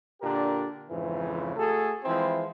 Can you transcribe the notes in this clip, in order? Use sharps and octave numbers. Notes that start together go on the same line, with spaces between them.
A#2 D3 D4 G4 A#4
F2 G#2 C#3 E3
A3 F#4 G#4 A4
E3 F3 G#3 C4 E4